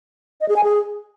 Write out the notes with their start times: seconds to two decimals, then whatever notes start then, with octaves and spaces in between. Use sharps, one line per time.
0.41 D#5
0.49 G#4
0.56 G#5
0.64 G#4